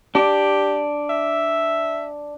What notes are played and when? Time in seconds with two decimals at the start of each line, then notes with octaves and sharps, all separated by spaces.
0.15 D4 G4
1.10 E5